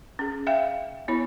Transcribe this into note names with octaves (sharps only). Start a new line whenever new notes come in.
C#4 G#4
E5 F5 G5
B3 E4 C#5 B5